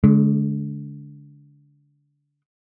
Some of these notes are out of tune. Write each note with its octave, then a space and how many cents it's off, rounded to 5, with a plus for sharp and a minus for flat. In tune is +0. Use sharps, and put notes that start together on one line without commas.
D3 -25 G#3 +30